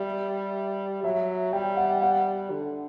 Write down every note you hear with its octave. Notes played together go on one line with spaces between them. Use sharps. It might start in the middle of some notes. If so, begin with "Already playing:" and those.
Already playing: G3 E5
F#3 E5
G3 G5
F#5
F#5
D3